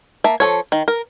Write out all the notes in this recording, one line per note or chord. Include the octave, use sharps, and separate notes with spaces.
A#3 E5 A5
F3 A4 C#5
D#3
A#4